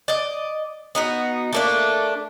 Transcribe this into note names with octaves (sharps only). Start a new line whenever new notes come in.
D5 D#5
B3 D#4 F#4
A3 A#3 D4